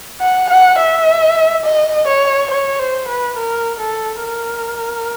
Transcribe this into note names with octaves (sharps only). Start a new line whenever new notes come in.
F#5
F#5
E5
D#5
C#5
C#5
C5
B4
A#4
A4
A#4